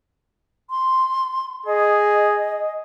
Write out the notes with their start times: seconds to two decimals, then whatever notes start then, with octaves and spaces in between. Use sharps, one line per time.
0.70 C6
1.66 G#4 D#5